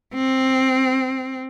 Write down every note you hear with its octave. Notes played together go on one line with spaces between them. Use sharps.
C4